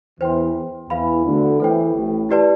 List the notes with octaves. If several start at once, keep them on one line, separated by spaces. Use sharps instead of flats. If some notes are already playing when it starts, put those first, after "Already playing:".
E2 E3 C5 G5 C6
E2 E3 B4 F5 B5
D2 D3
E2 E3 A4 C5 G5
A1 A2
E4 G4 B4 D5 A5